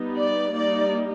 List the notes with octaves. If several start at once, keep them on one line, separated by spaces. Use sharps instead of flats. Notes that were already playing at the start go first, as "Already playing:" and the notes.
Already playing: G3 B3 D#4
D5
G3 A#3 D#4 D5